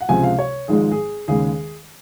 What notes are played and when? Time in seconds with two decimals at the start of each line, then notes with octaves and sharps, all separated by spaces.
0.01 F#5
0.09 C#2 C3 F3 G#3 G#5
0.23 F5
0.39 C#5
0.68 G#1 G#2 F3 G#3 G#4
0.91 G#4
1.28 D#2 C#3 G#3 G#4